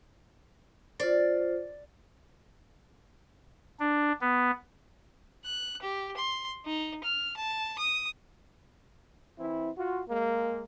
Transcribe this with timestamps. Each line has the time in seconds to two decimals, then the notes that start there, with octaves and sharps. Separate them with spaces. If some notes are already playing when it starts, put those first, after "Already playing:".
1.00 F4 C5 D5
3.80 D4
4.21 B3
5.45 F#6
5.82 G4
6.16 C6
6.65 D#4
7.04 F6
7.37 A5
7.79 D#6
9.39 E3 C4 E4
9.77 F4 F#4
10.08 G#3 A#3